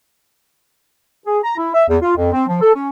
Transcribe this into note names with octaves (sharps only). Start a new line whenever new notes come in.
G#4
A#5
E4
E5
E2
F4
F2
C4
F3
A4
C#4